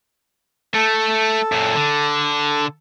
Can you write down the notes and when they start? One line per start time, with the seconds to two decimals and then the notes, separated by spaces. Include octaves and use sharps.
0.74 A3 A4
1.52 F#2 A#2
1.75 D3